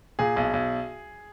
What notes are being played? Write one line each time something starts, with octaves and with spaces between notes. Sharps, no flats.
A#2 G#4
B1
B1